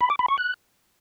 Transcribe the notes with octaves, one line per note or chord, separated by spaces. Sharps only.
B5
D6
B5
C#6
F#6